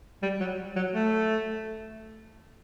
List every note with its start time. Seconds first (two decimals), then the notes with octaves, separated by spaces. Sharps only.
0.22 G3
0.40 F#3
0.76 F#3
0.93 A3